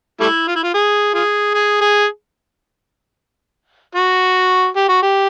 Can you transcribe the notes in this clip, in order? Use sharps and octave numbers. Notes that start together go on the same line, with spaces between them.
G3 A3 E4
F4
E4
F4
G#4
F4 G#4
G#4
G#4
F#4
G4
F#4
G4